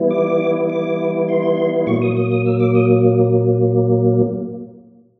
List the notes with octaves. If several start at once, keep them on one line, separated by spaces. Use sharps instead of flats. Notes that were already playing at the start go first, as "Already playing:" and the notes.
Already playing: E3 G3 B3 E4
D6
D6
C6
A#2 F#3 A#3 C#6
D#6
D#6
D#6
E6
D6
D#6